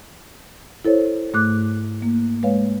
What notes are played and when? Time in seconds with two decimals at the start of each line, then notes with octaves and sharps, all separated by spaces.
0.85 E4 A4 C5 C#5
1.34 G#2 A3 D6 F#6
2.02 A#3
2.43 G#3 B4 C#5 F5